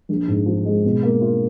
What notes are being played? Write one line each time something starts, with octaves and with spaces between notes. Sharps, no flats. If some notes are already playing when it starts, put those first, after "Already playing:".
A#1
G#2
F3
G#3
B2
A#3
F4